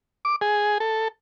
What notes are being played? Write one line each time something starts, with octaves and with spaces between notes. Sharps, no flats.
D6
G#4
A4